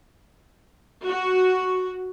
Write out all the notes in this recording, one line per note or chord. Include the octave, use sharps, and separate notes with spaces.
F#4